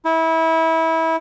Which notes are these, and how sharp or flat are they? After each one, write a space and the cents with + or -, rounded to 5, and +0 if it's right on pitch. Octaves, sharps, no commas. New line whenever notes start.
E4 -25